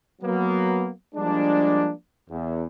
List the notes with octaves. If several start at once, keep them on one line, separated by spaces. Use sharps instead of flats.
F#3 A#3 B3
F3 G3 G#3 A#3 D4
E2